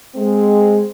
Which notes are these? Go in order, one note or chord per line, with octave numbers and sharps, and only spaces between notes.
G#3 C4